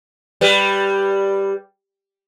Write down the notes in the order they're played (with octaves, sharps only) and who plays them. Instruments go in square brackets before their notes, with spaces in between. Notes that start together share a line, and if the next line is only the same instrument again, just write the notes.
[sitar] G3 B4